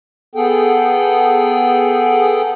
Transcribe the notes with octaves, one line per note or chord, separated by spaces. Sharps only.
B3 G#4 A4 G5